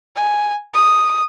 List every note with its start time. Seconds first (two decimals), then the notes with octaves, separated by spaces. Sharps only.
0.16 G#5
0.74 D#6